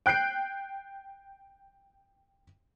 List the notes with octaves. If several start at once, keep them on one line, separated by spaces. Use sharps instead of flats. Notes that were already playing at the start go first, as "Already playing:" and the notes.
G5 F#6 G6 C7 D7